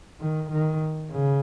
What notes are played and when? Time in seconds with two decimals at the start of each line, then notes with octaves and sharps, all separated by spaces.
0.21 D#3
0.51 D#3
1.11 C#3